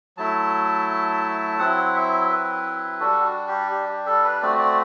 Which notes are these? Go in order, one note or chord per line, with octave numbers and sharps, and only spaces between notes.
F#3 A3 E4 A5
F#3 C4 E4 F#5
E5
B4
G3 D4 F#4 A4
F#4
G4
G4
G4
A4
B4
A3 C4 F#4 D5
D5